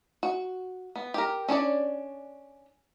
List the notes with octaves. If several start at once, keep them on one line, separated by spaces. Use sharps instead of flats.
F#4
B3
G4 A#4
C#4 D4 C#5 D5